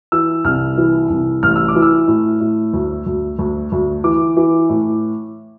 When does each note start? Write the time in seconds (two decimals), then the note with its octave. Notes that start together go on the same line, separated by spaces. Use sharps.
0.12 E3 E6
0.44 C2 F6
0.78 E3
1.10 C2
1.43 A1 F6
1.56 E6
1.68 D6
1.76 E3
1.82 E6
2.08 A2
2.41 A2
2.73 D2
3.06 D2
3.39 D2
3.72 D2
4.04 E3 D6
4.37 E3
4.69 A2